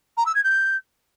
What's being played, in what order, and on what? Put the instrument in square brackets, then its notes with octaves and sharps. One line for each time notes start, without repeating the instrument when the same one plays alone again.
[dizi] A#5
E6
G#6
G6